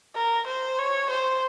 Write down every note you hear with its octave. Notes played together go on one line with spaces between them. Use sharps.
A#4
C5
C#5
C5